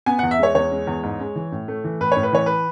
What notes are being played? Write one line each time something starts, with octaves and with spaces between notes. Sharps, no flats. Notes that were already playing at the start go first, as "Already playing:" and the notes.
B3 G#5
E2 F#5
E5
G#3 C#5
E2 C#5
G#3
E2
G#2
G#3
E3
A2
A3
E3
A2 B4
C#5
A2
B4
E3 C#5
B4